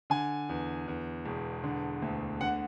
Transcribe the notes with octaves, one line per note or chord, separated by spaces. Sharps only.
D3 G#5
E2
E2
E1
D3
D2
D3 F#5